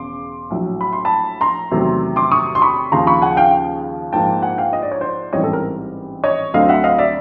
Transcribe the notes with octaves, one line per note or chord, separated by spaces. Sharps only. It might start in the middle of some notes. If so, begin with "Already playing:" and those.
Already playing: E1 C#3 C6 D6
A#1 A2 F#3
B5
C6
A5 B5
A#5 C6
E2 C3 D#3 F#3 A3
C6 D6
C#6 D#6
C6
B5 C#6
D#2 C#3 F3 A#5 C6
B5 C#6
F#5 G#5
F5 G5
A#1 G#2 F3 A#3 G5 A5
F#5 G#5
F5 G5
D#5
D5
C#5
C5 D5
A1 G#2 E3 G3 C4 C#5 D#5
A4
A#4
C#5 D#5
D2 D3 F#3 A3 C4 D#5 F5
E5 F#5
D#5 F5
D5 E5